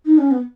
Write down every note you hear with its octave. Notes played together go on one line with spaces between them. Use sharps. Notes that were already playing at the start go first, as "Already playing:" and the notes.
D#4
C#4
B3